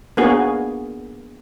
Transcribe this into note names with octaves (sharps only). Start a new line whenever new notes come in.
A#3 B3 D4 F#4 G#4